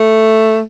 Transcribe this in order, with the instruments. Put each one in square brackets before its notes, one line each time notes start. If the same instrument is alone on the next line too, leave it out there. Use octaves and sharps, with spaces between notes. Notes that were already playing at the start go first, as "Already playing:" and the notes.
Already playing: [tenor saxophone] A3